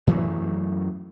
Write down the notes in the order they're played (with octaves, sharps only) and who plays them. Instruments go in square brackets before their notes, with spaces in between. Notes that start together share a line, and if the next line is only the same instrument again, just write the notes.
[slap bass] F#2 E3 F#3 A3